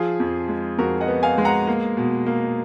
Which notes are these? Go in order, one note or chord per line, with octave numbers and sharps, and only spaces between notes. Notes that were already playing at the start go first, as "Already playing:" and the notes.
Already playing: F3 F4 G#4
F2
G#3
F2 F#4 A#4
D#5 F#5
B3
F5 G#5
G#3
F#5 A#5
A#3
B2
A#3